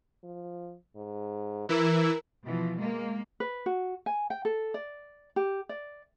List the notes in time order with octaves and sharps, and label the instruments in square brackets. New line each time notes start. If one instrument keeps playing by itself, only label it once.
[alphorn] F3
G#2
[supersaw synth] E3 E4 E6 [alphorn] A#4
[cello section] B2 E3 F3
G#3 A#3
[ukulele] B4
F#4
G#5
G5
A4
D5
G4
D5